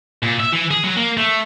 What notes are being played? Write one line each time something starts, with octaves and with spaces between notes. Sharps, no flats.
A#2
E5
E3
G#4
F#3
A#3
A3